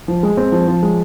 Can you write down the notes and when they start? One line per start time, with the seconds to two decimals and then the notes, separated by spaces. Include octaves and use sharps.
0.08 F3
0.23 G#3
0.37 C4
0.52 F3
0.68 F3
0.83 G#3